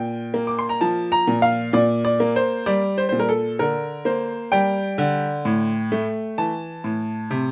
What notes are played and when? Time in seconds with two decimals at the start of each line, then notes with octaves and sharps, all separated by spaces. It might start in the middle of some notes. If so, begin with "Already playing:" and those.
Already playing: A#2 G5
0.34 A#3
0.47 D6
0.59 C6
0.69 A#5
0.81 F3 A5
1.12 A#5
1.27 A#2
1.42 F5
1.73 A#2 D5
2.05 D5
2.20 A#3
2.36 C5
2.66 G3 D5
2.98 C5
3.09 A#2 C5
3.19 A#4
3.29 A4
3.59 D3 A#4
4.05 A#3 C5
4.52 G3 G5
4.98 D3
5.45 A2
5.92 A3
6.38 E3 A5
6.84 A2
7.30 C3